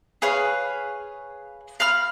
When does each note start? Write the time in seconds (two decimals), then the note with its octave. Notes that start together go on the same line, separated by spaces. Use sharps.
0.22 G#4 B4 C#5 F5
1.80 F5 B5 F6